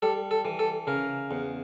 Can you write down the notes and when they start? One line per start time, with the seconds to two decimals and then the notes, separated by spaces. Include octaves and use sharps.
0.02 G3 A4
0.31 A4
0.45 E3
0.59 A4
0.87 C#3 A#4
1.31 E2